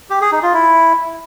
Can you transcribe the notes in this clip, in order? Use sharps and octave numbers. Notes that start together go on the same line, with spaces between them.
G4
G#4
D#4
F4
E4